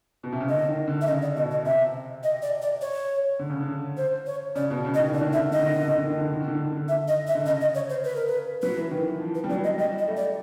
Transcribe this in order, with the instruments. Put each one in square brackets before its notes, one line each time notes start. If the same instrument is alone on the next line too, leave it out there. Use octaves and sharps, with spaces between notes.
[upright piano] B2
C3
C#3
[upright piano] D3 [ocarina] D#5
[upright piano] D#3
D3
[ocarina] E5
[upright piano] C#3 [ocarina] D#5
[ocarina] D5
[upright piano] B2 [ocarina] D#5
[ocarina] D#5
[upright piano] C3 [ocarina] E5
[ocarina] D#5
D5
D5
C#5
[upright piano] D3
C#3
D3
[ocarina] C5
C#5
[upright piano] C#3 [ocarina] D5
[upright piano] B2
C#3
[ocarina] D#5
[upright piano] D#3
[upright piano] D3 [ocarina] D5
[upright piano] D#3
D3
[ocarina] E5
[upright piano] D#3
D3
[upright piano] D#3 [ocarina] D#5
[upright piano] D3
D#3
D3
D#3
D3
D#3
D3
D#3
D3
D#3
D3
D#3
D3
D#3
D3
D#3
D3
[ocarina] E5
D#5
E5
[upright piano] D3
[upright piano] C#3 [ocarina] D#5
[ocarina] D#5
C#5
C5
B4
A#4
B4
[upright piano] F#3 [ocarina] B4
[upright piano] E3
D#3
E3
F3
[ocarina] B4
[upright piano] G3
[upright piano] F#3 [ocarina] D5
[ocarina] D#5
[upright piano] G3 [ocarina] D#5
[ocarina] D#5
[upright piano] A3
[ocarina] D5